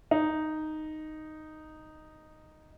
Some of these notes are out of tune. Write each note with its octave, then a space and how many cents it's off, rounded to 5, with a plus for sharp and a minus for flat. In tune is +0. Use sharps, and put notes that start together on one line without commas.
D#4 -5